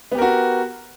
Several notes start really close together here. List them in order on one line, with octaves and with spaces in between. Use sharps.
B3 G4 A#4 F#4